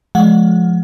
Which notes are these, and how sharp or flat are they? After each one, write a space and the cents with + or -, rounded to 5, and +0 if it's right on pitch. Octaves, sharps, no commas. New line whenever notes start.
F3 +5 G#3 +35 F#5 -20